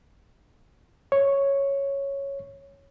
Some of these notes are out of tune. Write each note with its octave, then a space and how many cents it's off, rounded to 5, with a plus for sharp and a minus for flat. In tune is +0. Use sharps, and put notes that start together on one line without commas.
C#5 -5